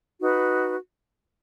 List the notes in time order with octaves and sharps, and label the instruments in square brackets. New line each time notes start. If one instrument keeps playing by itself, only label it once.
[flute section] D#4 F#4 B4